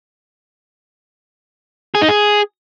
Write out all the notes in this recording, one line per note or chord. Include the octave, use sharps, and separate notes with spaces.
G#4
D#4
G#4